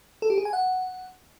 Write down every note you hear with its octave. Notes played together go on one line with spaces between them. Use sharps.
A4
G4
G#4
G#5
F#5